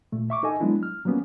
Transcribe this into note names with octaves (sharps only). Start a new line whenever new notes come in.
A#2 A3
E5 C#6 D6
D#4 A4 D#5 G#5
F#3 G#3 B3 D4 E4
F6
F#3 G3 A#3 B3 C#4